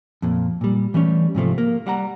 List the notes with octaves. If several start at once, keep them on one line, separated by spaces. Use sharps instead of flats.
F2 A#2
A#2 G3
E3 G3 A3 C#4
G#2 C3 F3 A3
A#3
G3 F#5 A#5